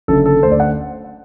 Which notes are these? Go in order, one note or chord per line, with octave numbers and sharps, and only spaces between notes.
F#1 F#2 D3 A4
A4
D2 D3 A3 C5
D5
F#5